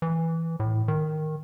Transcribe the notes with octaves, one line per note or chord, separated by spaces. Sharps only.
E3
A2
D#3